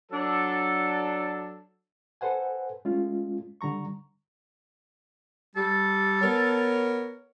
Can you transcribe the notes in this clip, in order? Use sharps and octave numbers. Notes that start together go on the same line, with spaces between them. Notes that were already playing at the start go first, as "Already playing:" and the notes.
F#3 D4 A4
A4 B4 C5 F#5 G#5
G#3 A3 C#4 F4
D3 G3 A#5 C#6
G3 A4
B3 A#4 C#5